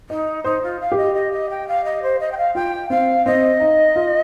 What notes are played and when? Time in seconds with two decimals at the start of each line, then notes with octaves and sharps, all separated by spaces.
0.10 D#4 D#5
0.44 D#4 C5
0.63 F4
0.80 F5
0.92 G4
0.97 D#5
1.14 D#5
1.32 D#5
1.50 G5
1.68 F5
1.85 D#5
2.03 C5
2.20 D#5
2.32 G5
2.37 F5
2.55 F4 G5
2.90 C4 F5
3.26 C4 D#5
3.60 D#4
3.96 F4